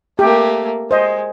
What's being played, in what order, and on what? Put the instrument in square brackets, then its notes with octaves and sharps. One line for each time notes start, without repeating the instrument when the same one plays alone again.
[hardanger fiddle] A3 A#3 [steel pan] G4
[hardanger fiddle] G#3 [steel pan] C5 D#5